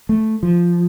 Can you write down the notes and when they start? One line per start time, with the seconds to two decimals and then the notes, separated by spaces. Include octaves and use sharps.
0.09 A3
0.43 F3